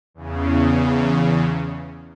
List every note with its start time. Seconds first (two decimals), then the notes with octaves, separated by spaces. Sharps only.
0.14 E2 C#3